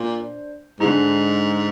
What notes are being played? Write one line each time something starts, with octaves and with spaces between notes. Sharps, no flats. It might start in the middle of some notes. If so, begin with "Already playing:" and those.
Already playing: A#2 D4 C5
G#2 D3 G#3 D#4